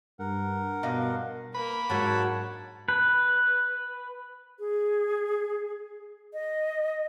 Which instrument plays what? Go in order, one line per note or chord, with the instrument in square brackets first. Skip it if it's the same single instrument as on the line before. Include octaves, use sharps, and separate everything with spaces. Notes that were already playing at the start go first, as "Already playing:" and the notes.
[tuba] G2 [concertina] A#4 F#5
[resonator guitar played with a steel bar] G2 D#5 F5 [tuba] B2
[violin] A#3 A#4 [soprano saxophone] B5
[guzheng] G#2 F#3 D4 [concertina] C#5 F#5 A5
[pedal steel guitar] B4
[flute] G#4
D#5